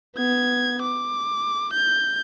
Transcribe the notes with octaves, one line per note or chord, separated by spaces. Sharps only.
B3 G#6
D6
G6